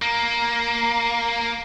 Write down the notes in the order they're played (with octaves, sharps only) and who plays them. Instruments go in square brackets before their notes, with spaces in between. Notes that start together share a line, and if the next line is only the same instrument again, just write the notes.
[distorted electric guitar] A#3 [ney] A#5